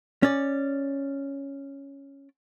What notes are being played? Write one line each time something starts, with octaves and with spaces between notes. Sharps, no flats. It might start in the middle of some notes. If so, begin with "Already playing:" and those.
C#4 D5